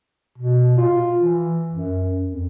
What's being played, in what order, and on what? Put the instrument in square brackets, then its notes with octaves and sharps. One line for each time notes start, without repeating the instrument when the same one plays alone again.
[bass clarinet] B2
F4
E3
F#2
F2